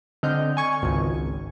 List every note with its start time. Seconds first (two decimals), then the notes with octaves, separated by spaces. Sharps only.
0.23 D3 C4 D#5 F6 G6
0.57 G#5 C#6 G#6
0.82 G#1 C#2